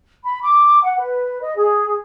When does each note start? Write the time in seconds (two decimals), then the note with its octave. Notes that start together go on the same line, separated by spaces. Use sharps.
0.24 B5
0.43 D6
0.83 F#5
0.98 B4
1.40 D#5
1.57 G#4